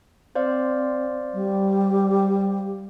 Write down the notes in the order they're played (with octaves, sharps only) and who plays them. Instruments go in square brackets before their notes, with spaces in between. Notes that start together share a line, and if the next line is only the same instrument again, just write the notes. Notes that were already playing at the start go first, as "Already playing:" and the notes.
[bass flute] C4 [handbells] C5 D5 F5
[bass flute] G3